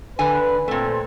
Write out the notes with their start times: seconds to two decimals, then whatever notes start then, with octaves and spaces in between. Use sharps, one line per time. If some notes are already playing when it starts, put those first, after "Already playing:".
0.19 D3 B4 G#5
0.68 A#2 A3 C4 A4